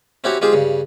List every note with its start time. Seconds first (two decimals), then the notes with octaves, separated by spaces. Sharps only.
0.24 C4 C#4 E4 F#4 G4 C#5
0.41 G#3 C4 F4 G4 G#4 C5
0.53 G2 C#3